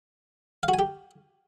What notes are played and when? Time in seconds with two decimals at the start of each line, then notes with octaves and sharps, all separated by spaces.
0.63 F5
0.68 F#4
0.74 G#5
0.79 G4